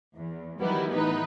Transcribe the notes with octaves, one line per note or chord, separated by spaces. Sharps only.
E2
D#3 F#3 G3 B3 E4
A2 E3 B3 D#4 B4